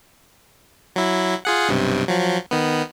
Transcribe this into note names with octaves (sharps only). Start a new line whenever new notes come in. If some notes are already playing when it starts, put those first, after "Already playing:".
F#3 E4
F4 G#4 F#5
B1 G2 C3
F3 F#3
D#3 B3